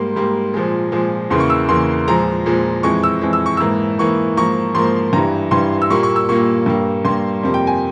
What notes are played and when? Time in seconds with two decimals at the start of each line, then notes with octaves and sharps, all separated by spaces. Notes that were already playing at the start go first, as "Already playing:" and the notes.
Already playing: G#2 G3 A#3 C6
0.16 G#2 G3 A#3
0.54 A#2 F3 G#3
0.92 A#2 F3 G#3
1.30 E2 C#3 E3 A#3 C6
1.40 C#6
1.50 E6
1.68 E2 C#3 E3 A#3 C6
2.08 A#2 F3 G#3 A#5
2.46 A#2 F3 G#3
2.83 F2 E3 G#3 C#6
3.03 E6
3.21 F2 E3 G#3
3.33 E6
3.46 C#6
3.57 G#2 E3 A#3 E6
3.98 G#2 E3 A#3 C#6
4.37 G#2 F3 A#3 C#6
4.75 G#2 F3 A#3 C6
5.13 G2 E3 G3 A#5
5.51 G2 E3 G3 C6
5.82 E6
5.90 A#2 G3 A#3 C#6
6.03 C#6
6.16 E6
6.29 A#2 G3 A#3 C#6
6.66 G2 G3 A#3
7.05 G2 G3 A#3 C6
7.43 F2 C3 G3 A#3
7.54 G5
7.67 G#5